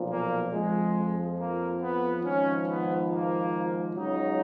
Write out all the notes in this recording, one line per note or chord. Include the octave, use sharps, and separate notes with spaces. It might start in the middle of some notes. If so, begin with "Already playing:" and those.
Already playing: B1 A#2 F3
A#3
F2 F3 G#3
A#3
B3
G#1 G#2 F3 C#4
B3
A#3
C#2 C#3 F#3 D#4